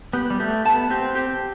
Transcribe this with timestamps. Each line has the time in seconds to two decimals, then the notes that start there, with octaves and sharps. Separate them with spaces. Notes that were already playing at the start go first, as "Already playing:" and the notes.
0.13 B3 G4
0.30 G3
0.40 A3 G4
0.65 B3 A5
0.90 C4 G4
1.15 G4